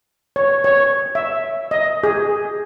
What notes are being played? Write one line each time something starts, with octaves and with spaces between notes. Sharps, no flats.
C#5
C#5
E5
D#5
G#4